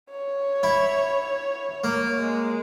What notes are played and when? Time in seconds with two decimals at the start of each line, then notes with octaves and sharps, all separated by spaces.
0.10 C#5
0.63 E4
1.84 A#3
2.19 G#3